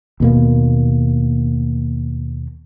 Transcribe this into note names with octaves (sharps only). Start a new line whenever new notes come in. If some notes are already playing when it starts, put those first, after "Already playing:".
D#2 B2 A#3